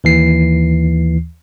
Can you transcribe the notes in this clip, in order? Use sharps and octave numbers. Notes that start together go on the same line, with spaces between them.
D#2 E3 C7